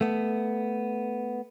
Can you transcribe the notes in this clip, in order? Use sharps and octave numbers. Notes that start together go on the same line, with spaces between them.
A3 B3